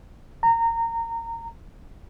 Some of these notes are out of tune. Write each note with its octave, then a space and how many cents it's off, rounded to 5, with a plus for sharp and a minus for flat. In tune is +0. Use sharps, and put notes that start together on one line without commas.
A#5 -20